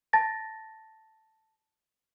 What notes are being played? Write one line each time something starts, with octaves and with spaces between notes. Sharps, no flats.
A5 A6 A#6